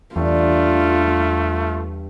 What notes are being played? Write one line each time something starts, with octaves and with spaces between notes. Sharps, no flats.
E2 G2 A3 F4